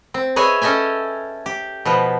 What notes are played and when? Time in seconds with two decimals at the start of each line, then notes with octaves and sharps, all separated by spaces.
0.14 C4
0.36 G#4 B4 C#5 D#5 E5 G#5
0.62 C#4 A4 D#5 E5 G5 G#5
1.46 G4
1.85 B2 F3 B3